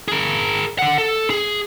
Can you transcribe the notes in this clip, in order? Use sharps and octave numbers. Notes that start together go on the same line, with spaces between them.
G#4 A#4
D3 F#5
A4
G#4